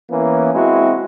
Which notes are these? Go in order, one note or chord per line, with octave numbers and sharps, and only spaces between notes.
E3 A#3 B3 C#4
G#3 C4 E4 F#4